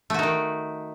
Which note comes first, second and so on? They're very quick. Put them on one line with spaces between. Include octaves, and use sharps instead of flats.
A3 F#4 D#4 D#3